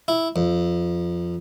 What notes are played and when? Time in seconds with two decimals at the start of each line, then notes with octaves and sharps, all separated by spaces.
0.08 E4
0.36 F2